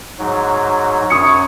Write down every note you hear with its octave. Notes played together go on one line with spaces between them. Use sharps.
G#2 F#3
F#2 C#5 C#6 D#6 C#7